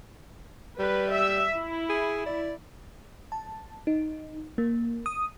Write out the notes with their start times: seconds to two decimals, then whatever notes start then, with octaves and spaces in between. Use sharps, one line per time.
0.79 G3 B4
1.12 E5
1.55 E4
1.89 G#4
2.26 D5
3.32 A5
3.87 D#4
4.58 A#3
5.06 D#6